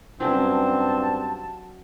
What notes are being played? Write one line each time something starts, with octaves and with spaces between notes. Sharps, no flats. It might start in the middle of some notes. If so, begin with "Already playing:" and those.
G2 F#3 C4 C#4 G5 A5